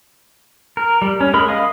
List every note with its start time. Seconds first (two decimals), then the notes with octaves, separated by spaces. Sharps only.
0.77 A#4
1.02 G3
1.21 C#4
1.34 G#3 A#4 B5
1.48 D#5 F5 D#6